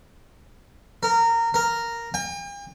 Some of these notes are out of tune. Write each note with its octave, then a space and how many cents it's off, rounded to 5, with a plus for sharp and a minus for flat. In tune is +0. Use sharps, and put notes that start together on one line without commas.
A#4 -20
A#4 -5
G5 +45